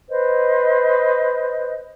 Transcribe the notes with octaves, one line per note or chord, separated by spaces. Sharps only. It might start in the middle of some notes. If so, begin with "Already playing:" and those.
B4 C5 D#5